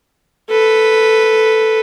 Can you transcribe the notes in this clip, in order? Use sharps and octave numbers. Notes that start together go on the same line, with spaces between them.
A4 B4